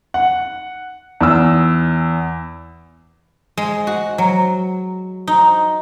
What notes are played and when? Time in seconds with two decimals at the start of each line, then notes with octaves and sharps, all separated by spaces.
0.14 F#5
1.21 E2 E6
3.57 G#3
3.87 F#4
4.18 F#3
5.27 D#4